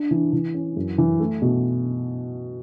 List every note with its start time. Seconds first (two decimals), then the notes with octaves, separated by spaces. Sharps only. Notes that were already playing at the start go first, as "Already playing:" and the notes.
Already playing: D4
0.11 E3
0.33 E3
0.54 C#4
0.76 F#2
0.98 E3
1.20 A3
1.42 B2